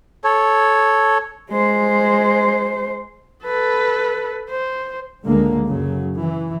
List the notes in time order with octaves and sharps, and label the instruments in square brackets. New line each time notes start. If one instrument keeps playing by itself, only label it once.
[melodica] A4 C#5
[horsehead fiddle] G#3 C5
A4 B4
C5
[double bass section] C#2 G#2 D3 G#3 A#3
F#2 C#3 F#3
E3